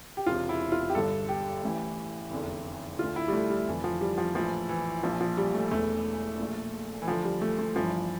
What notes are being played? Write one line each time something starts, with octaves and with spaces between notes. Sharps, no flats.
G4
E1 E2 C3 F4
E4
F4
G4
G1 G2 D3 A4
G4
A1 A2 E3
F1 E2 D3
D2 D3 F4
E4
G3
A3
G3
F1 F2 D3 E3
F3
G3
F3
A#1 A2 E3 F3
E3
A#1 A#2 F3
F3
G3
A3
E1 E2 E3 A3
A#1 A#2
E3
D2 D3 F3
G3
A3
A3
G1 G2 E3 F3